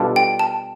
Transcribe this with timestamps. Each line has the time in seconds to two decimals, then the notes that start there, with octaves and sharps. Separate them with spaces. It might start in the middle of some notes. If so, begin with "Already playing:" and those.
Already playing: B2 G3 D4 F4 A4
0.16 G5
0.39 A5